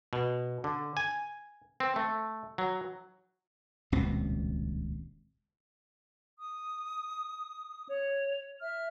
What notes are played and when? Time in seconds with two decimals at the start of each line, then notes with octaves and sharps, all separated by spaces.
0.13 B2
0.64 D3
0.97 G#5
1.80 C4
1.96 A3
2.58 F#3
3.92 D#1 C#2 B2 C4
6.38 D#6
7.88 C#5
8.61 E5 F6